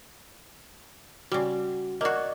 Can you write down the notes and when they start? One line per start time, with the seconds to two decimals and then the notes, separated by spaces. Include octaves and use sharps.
1.32 C#3 G3 F#4
2.01 A#3 F#4 D5 D#5